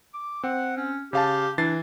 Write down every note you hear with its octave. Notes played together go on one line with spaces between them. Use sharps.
D6
C4 F#5
C#4
C#3 G4 F5 A5
E3 D4 A6 C7